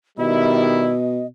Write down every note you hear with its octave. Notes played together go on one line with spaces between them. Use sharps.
B2 D#3 G3 E4 D#5